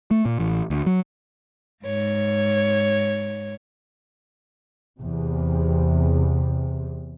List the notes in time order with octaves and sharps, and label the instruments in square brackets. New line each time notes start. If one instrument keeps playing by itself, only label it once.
[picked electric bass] A3
A#2
A1
D2
F#3
[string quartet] G#2 C#5
[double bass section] E2 C3